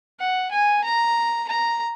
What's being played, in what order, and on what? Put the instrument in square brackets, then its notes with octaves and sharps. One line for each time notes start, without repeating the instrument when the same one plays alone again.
[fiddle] F#5
G#5
A#5
A#5